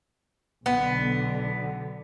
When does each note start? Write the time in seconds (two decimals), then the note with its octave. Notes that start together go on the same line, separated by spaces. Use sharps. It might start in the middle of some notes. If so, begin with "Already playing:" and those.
0.66 B1 D3 B3